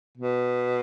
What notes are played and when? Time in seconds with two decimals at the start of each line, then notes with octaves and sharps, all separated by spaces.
0.17 B2